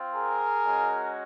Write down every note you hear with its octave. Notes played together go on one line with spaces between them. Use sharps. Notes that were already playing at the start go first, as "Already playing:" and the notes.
Already playing: C4 F4
G#4 A#4
G#3 C#4 F#4